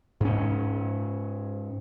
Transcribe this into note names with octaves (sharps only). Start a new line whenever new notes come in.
G#2 C#4